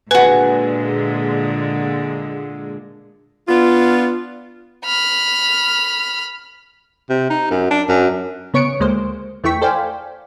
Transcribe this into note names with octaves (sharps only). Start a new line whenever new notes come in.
A#2 D3 G#3 F#4 B4 G#5
B3 D4 F4
B5 F6
C3
D#4
F#2
D4
F#2
C#3 B3 C#5 C#6 C#7 D7
D2 G#3 A#3 C5
E2 A3 E4 G5 C#6 B6
A4 C5 D5 F5 G5 G#5